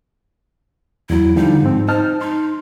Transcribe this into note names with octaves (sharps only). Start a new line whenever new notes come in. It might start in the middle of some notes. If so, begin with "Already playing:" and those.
E2 F#3 E4
D3 F3 G3 D#4
G#2 C4
D#4 C5 A5 F6
D#4 C6